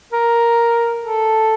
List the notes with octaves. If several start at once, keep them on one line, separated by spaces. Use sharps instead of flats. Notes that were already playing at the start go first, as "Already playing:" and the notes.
A#4
A4